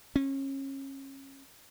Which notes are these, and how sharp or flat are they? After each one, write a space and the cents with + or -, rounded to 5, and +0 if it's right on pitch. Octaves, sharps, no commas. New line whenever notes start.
C#4 -30